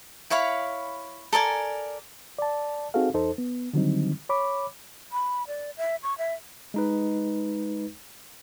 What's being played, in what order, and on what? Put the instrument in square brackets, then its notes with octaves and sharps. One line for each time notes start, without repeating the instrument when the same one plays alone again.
[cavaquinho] E4 C#5 F5 B5
A4 A#4 D5 G#5
[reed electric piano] D5 A5
C4 D#4 F#4 G#4 A4 F5
E2 D#4 A4 C5
B3
D3 D#3 F#3 G3 C4 D#4
C#5 B5 D6
[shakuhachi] B5
D5
E5
C#6
E5
[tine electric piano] G#3 D#4 B4